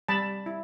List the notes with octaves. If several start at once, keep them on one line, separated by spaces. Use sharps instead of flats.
G3 A5 B5
E4